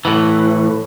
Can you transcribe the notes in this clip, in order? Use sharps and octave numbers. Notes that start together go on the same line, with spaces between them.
A2 E3